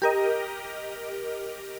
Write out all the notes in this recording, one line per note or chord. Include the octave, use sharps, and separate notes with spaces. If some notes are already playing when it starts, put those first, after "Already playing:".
G4 A#4 D#5